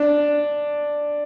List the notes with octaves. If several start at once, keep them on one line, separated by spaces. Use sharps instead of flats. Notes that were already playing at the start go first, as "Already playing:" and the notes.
Already playing: D4